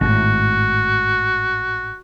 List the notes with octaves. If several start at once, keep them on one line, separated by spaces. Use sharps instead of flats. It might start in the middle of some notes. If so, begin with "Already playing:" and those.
G#1 A2 F#4